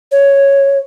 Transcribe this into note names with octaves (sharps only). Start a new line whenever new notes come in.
C#5